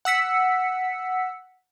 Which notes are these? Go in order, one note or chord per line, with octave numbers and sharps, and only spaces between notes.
F#5 E6 B6 C#7